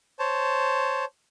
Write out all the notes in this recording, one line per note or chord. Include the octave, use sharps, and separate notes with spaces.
C5 C#5 A5